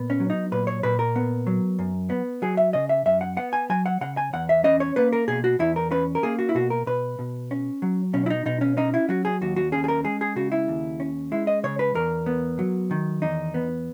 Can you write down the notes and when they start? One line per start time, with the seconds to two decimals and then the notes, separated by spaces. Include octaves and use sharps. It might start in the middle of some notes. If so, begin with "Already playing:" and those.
Already playing: A#2 B3
0.10 C#4
0.20 F#3
0.30 D#4
0.52 A#2 B4
0.67 C#5
0.83 A#2 B4
0.99 A#4
1.16 B3
1.47 F#3
1.79 F#2
2.10 B3
2.42 F#3 G#4
2.57 E5
2.73 C#3 D#5
2.89 E5
3.06 F#2 E5
3.21 F#5
3.37 B3 F#5
3.53 G#5
3.69 F#3 G#5
3.86 F#5
4.01 C#3 F#5
4.17 G#5
4.33 E2 F#5
4.49 E5
4.64 C#4 D#5
4.80 C#5
4.96 A#3 B4
5.13 A#4
5.28 B2 G#4
5.44 F#4
5.59 E2 E4
5.76 A#4
5.91 C#4 B4
6.15 A#4
6.23 A#3 G#4
6.39 F#4
6.49 E4
6.55 B2 F#4
6.70 A#4
6.86 B2 B4
7.19 B2
7.51 C#4
7.82 F#3
8.13 B2 C#4
8.26 E4
8.30 D#4
8.45 B2 D#4
8.61 C#4
8.77 C#4 D#4
8.94 E4
9.09 F#3 F#4
9.25 G#4
9.41 D#2 F#4
9.56 F#4
9.72 C#4 G#4
9.84 G#4
9.88 A#4
10.04 G#3 G#4
10.21 G#4
10.36 C#3 F#4
10.52 E4
10.68 D#2
11.00 C#4
11.32 G#3 E4
11.47 D#5
11.64 C#3 C#5
11.79 B4
11.95 E2 A#4
12.26 B3
12.59 F#3
12.91 D#3
13.22 E2 D#4
13.54 B3